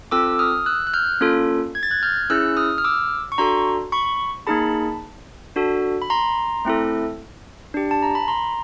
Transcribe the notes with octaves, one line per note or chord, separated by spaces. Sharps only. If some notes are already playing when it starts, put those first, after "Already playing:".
C4 F4 A4 D6 E6
D#6 F6
E6 F#6
F#6
F6 G6
A#3 C#4 F4 A4
G#6
A6
F#6 G#6
F6 G6
C#4 E4 G#4 E6 F#6
D#6 F6
F6
D6 E6
C#6
D4 F#4 A4 A#5 C6
B5 C#6
A#3 D#4 G#4 A5 B5
D4 F#4 A4
B5
A#5 C6
A3 C4 E4 A4
D4 G4
A5
A#5
B5
A#5 C6